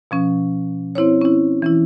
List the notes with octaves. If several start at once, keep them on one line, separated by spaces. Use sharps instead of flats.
B2 F3 C#4
C4 E4 C5 C#5
C#4 E4
E3 C#4 E4